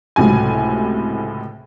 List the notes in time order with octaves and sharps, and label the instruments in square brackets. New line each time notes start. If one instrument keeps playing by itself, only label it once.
[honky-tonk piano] C#2 A2 C3 F#3 G#5